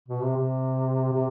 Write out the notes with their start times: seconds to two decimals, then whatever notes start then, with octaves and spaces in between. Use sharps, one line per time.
0.08 B2
0.22 C3
0.36 C3
1.12 C3